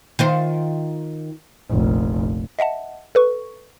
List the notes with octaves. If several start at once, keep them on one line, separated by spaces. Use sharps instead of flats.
D#3 F4 C5
F1 A#1
D#5 E5 F#5 A5
A4 B4 C#6